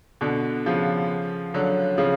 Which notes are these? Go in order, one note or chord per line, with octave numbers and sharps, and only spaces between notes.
B2 D3
C#3 F3
D3 F#3
C#3 F3